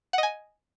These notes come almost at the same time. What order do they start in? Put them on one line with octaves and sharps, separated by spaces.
F#5 D#5 G#5